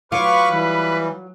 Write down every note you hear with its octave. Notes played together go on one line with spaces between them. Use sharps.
F#3 F4 B4 C#6 D6 F6
E3 G3